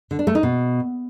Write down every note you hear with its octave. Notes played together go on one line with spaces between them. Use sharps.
D3
D4
A3
D#4
B2